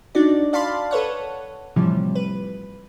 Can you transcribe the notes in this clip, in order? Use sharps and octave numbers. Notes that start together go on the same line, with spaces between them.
D4 D#4 F#4 D5
D5 F5 A5 B5 C6
A4 B4 C#5 F#5
A2 C3 E3 F3 G3
B4